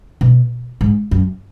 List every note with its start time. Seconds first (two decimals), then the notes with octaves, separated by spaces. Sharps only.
0.21 B2
0.81 G#2
1.11 F#2